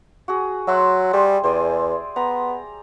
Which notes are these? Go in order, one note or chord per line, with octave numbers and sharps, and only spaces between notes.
F#4 G#4
F#3 E5 F#5 C6
G3 G4 G#4 C5
E2 C5 D5 G#5
B3 A#5